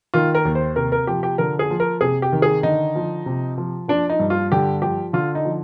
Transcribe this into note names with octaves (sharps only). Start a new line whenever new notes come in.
D#3 F4
A#4
D#2
C5
C3 A#4
A#4
F3 G4
G4
D3 A#4
G#4
F3
A#4
C3 G#4
G4
D#3
G#4
D3 D#4
F3
C3
F3
F3 D4
D#4
G2
F4
D3 G4
F3 G4
D3 F4
D#4
F3